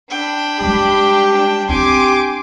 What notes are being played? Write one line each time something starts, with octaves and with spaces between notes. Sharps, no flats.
D4 G5 B5
G3 G#3 G4
D4
C4 D4 G4 G#5 C6 D6